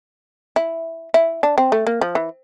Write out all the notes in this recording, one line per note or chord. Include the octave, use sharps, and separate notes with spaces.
E4
E4
D4
C4
A3
A#3
F3
E3